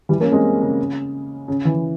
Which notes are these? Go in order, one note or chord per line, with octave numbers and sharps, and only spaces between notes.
E3 G3
A#3 C#4
G#3 C4
C#3
C#3
E3